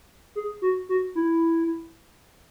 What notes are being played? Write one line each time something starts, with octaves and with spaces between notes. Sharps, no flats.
G#4
F#4
F#4
E4